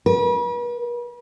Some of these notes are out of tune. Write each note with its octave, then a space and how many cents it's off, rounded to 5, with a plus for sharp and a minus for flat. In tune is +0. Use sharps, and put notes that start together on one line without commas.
B4 -40